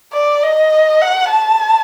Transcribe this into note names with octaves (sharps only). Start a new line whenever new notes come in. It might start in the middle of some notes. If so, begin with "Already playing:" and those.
D5
D#5
F#5
A5